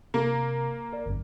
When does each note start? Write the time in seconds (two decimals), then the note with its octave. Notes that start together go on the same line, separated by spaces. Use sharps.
0.14 C3 A#3
0.93 A#4 D5
1.06 G1 F#2